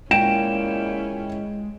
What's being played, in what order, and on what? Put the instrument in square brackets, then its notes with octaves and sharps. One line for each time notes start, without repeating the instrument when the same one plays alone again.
[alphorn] A#2 [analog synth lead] G#3 [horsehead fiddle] C#4 E4 [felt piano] G5 D7 E7